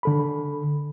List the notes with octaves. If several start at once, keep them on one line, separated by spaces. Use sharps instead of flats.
D3 A4 B5